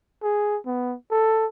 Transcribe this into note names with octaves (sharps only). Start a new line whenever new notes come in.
G#4
B3
A4